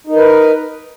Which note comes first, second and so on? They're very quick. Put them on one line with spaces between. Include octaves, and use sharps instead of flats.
D#4 A#4 B4